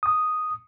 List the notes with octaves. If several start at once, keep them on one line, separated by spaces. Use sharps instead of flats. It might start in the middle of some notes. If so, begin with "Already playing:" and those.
D#6